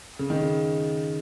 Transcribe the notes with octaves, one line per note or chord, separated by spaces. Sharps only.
C#3
D#3
C#3